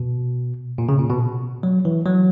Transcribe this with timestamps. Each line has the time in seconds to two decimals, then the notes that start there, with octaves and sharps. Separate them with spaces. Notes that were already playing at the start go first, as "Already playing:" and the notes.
Already playing: B2
0.78 A#2
0.89 C#3
0.99 A#2
1.10 B2
1.63 F#3
1.85 E3
2.06 F#3